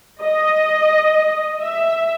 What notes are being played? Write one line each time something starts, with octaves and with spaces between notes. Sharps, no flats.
D#5
E5